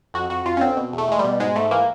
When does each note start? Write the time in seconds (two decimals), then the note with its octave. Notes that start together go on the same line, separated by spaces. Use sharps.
0.14 F2 F#4
0.30 F2 F#4
0.46 F2 F4
0.57 C#4
0.61 D3 C4
0.77 B2
0.93 E2 A3
1.08 E2 G#3
1.19 G3
1.24 B2
1.40 G#2 G#3
1.56 G#2 A3
1.71 E3 A#3